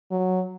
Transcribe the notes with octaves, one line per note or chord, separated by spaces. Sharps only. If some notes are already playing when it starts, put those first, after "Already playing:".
F#3